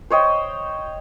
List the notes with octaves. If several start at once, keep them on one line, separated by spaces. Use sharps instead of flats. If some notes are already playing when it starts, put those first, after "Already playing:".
C5 C#5 D#5 G5